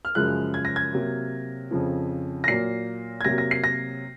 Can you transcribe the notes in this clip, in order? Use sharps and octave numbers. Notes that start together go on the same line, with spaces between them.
F6
F#2 C#3 F3 G#3 F#6
G#6
A#6
G#6
C3 F#3 A#3
F2 C#3 F3
A#6
A#2 F#3 A#3 C7
G#6
C3 F#3 A#3 A#6
A#6
C7
A#6